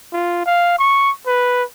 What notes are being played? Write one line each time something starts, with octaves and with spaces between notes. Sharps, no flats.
F4
F5
C#6
B4